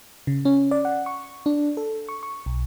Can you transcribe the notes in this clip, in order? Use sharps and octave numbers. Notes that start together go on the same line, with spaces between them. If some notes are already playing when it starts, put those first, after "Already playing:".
C#3
C#4
D5
F#5
C#6
D4
A4
C#6
C#6
B1